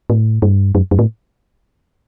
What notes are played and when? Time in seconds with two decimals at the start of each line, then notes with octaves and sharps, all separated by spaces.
0.10 A2
0.42 G2
0.75 F#2
0.91 F#2
0.99 A2